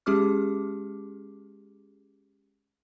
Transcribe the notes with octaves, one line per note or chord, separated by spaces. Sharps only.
G#3 C#4 G4 G#4 D6 F6